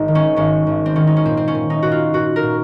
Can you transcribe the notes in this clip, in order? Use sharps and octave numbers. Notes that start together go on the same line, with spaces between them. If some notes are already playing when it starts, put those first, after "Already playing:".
Already playing: G#1 D#4
D#3
C#4
G#1 C#4
G#1
C4
D#3 C#4
D#4
C#4
A#2 C4
C4
C#4
A#2
D#4
A#2 F#4
F4
A#2 F#4
A#4
A#2